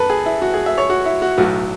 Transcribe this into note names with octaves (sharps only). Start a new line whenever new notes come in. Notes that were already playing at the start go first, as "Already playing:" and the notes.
Already playing: F#2 A4 B4
G#4
E4
F#4
G#4
E5
C#5
F#4
E4
F#4
B1 A2 F#3 F#4